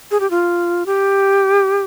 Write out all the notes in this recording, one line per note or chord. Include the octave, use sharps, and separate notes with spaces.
G#4
G4
F4
G4